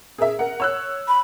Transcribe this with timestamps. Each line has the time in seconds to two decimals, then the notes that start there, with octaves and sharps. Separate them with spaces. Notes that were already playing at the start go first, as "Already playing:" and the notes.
0.18 G#4 A#4 E5
0.39 A#4 F#5
0.60 C#5 E6 F#6
1.08 B5